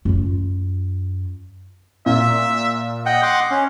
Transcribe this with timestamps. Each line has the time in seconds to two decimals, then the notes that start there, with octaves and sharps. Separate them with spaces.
0.05 F#2 F4
2.06 A#2 E5
3.06 D#5 F#5 G5
3.23 F#5 C6 D6
3.51 C#4